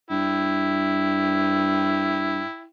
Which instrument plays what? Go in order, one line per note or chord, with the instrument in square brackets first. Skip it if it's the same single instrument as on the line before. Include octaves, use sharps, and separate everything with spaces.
[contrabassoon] G2 [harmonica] E4 G5